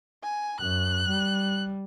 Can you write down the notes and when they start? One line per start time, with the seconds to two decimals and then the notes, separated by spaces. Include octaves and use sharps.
0.23 G#5
0.61 F#2 F#6
1.08 G3